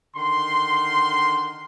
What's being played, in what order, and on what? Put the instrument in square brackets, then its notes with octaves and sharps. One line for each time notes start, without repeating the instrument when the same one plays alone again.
[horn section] D3 D#3 F#5 C6